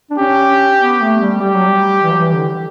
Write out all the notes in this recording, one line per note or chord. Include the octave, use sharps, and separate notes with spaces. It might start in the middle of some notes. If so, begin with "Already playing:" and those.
D4
C#4 G4
B3
A3
G3
G3 G4
F#3
G3
E3
F#3
E3
D3